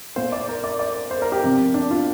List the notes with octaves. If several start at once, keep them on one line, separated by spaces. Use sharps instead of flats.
A#2 A#3 C5
D5
A#4
D5
D5
C5
A#4
G4
C3 F3 C4
D4
F4